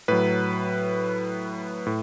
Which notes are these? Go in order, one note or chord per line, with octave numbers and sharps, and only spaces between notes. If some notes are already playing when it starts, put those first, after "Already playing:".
A2 F#3 B4
A2